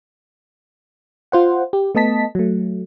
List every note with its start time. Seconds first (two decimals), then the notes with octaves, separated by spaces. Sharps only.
1.32 F4 C5 F#5
1.73 G4
1.95 A3 B3 D#5 A5 B6
2.35 F#3 A3